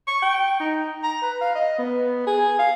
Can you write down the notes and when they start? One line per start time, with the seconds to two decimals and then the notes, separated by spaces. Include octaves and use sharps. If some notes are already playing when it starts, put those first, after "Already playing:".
0.07 C#6
0.22 G5
0.60 D#4
1.03 A#5
1.22 B4
1.41 F5
1.55 D#5
1.78 B3
2.27 G#4
2.59 F5